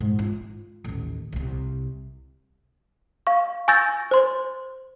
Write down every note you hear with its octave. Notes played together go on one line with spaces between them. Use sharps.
G#2
F4
A1 D#2
C2 C3
F5 C#6
G#5 C#6 E6 G6 A6 A#6
C5 C6